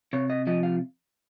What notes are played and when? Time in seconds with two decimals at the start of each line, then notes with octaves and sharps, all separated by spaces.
0.13 C3 C#5
0.30 D#5
0.47 F3 D#5
0.63 F5